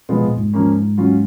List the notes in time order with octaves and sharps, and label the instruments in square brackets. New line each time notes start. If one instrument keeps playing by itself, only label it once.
[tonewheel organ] B2 [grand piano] F3 G#3 B3 F4
[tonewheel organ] A#2
G#2
[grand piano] F3 A#3 C#4
F#3 C#4 F4